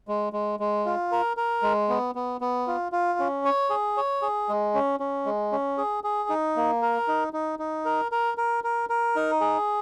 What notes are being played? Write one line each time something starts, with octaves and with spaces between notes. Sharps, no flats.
G#3
G#3
G#3
F4
A#4
A#4
G#3
B3
B3
B3
F4
F4
C#4
C#5
G#4
C#5
G#4
G#3
C#4
C#4
G#3
C#4
G#4
G#4
D#4
A#3
A#4
D#4
D#4
D#4
A#4
A#4
A#4
A#4
A#4
D#4
G#4